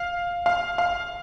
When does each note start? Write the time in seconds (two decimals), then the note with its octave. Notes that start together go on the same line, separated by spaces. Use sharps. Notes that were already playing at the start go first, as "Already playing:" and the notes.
Already playing: F5
0.46 F5
0.78 F5